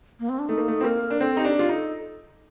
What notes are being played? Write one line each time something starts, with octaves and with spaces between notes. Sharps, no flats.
A#3
C4
D4
A3 D#4
A#3
A3
C4
A#3 A#4
D4
C4 A4
D#4 G4
D4
F4 G4
D#4
A4